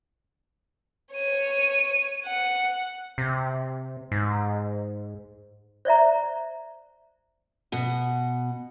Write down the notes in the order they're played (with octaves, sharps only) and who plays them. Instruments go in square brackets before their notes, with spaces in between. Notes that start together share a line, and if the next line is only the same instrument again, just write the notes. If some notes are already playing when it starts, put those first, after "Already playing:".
[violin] C#5 D#7
F#5
[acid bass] C3
G#2
[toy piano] C5 D5 E5 A#5
[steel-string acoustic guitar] B2 F#5